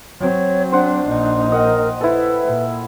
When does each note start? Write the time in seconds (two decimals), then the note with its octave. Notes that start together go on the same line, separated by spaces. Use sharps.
0.20 F#3 C4 C#5
0.72 D4 C5 F#5
1.08 A#1 D#4
1.52 A#4 D#5 F#5 G5
2.01 E4 A4 B4
2.44 A#2